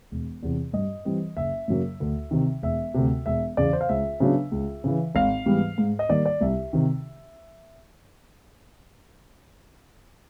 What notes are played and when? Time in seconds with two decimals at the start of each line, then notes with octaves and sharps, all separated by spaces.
0.11 E1
0.43 E2 C3
0.73 G2 D#5
1.05 E3 G3 C4
1.37 F#1 E5
1.68 F#2 C#3 F#3 A#3
2.00 D2
2.31 C3 D#3
2.62 E1 E5
2.94 D2 C3
3.26 E1 E5
3.57 E2 C#3 D5
3.73 C5
3.81 F5
3.89 C#2 E5
4.20 C#3 F#3 B3 D4
4.52 C#2
4.84 C#3 E3
5.15 G#1 F5
5.46 G#2 E3 G3 B3
5.78 G#2
5.99 D#5
6.09 D#3 G3 A#3 D5
6.26 D5
6.41 C2 E5
6.73 C3 D#3